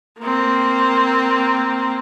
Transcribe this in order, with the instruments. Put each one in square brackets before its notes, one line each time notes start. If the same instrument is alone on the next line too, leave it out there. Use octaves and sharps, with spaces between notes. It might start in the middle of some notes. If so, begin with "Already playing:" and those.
[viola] A#3 C4